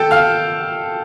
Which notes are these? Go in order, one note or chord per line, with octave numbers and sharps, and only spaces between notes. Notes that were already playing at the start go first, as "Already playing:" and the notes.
Already playing: A4 G5 A5
F5 F6